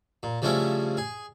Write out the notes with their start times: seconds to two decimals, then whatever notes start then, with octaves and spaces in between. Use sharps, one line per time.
0.23 A#2
0.42 C#3 F3 G3 A3 C#4 E4
0.97 G#4